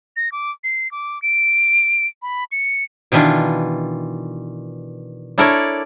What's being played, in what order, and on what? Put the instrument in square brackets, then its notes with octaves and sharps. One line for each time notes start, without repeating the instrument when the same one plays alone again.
[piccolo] A#6
D6
C7
D6
D7
B5
C#7
[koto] B2 D#3 E3 D4 F4
D4 E4 A4 A#4 C#5 D5